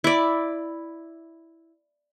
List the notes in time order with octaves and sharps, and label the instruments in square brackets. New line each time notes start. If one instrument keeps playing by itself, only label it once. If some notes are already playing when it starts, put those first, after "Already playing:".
[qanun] E4 D5